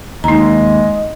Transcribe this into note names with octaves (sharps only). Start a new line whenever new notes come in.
D#2 G#3 D#4 D#5 A#5